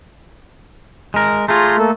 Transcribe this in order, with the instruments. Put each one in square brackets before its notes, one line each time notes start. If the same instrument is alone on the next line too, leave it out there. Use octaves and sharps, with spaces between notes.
[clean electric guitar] G#3 A#4
[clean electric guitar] A3 F4 [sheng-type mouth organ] G#4 A#5 C6
[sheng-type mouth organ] A3 A#3 A4